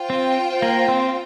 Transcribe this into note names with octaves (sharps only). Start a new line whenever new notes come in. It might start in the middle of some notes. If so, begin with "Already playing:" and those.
Already playing: F4 C5 G5
C4
A#3
C4